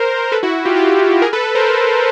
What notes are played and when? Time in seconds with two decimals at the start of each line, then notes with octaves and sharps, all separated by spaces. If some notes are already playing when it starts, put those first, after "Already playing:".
Already playing: A#4 C5
0.32 A4 B4
0.43 E4 F#4
0.54 E4 F#4
0.65 F4 G4
0.76 F4 G4
1.22 G#4 A#4
1.33 A4 B4
1.44 A4 B4
1.55 A#4 C5